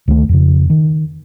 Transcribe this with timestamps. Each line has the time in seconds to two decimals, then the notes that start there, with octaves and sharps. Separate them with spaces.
0.08 D2 D#3 F3 A3
0.29 F2 C#3
0.70 D#3